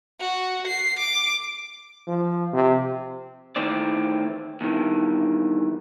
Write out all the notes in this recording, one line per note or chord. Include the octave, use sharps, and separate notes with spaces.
F#4
C7
D6
F3
C3
A2 D#3 E3 C4 D5
E2 G2 D#3 E3